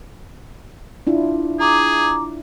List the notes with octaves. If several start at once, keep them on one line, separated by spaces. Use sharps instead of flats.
D4 E4 F4
G#4 A#5 D6